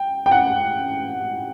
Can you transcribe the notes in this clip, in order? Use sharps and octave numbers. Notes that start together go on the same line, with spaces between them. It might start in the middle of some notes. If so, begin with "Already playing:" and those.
Already playing: G5
G5
F#5